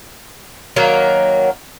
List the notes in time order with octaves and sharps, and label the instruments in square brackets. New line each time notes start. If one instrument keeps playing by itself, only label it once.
[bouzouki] D#3 F#3 A#3